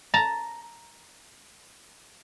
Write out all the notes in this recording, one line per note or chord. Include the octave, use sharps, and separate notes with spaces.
A5 A#5